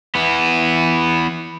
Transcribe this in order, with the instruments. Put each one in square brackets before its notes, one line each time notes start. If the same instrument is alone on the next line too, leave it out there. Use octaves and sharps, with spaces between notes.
[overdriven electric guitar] E3 B3